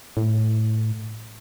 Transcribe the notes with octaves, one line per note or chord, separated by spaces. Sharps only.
A2